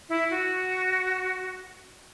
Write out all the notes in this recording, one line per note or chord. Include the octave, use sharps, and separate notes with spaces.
E4
F#4